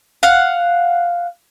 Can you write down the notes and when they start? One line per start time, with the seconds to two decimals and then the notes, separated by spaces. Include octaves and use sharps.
0.23 F5 F#5